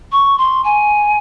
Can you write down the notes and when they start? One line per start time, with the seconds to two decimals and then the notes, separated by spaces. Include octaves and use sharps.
0.12 C#6
0.38 C6
0.64 G#5